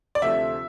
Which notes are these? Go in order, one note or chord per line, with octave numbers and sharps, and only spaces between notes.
D5
D2 C3 F3 A3 E5